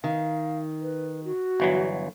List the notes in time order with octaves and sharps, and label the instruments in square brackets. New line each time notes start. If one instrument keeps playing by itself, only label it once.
[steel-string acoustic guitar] D#3 [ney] F5
[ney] B4
F#4
[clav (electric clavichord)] G1 E3 F#3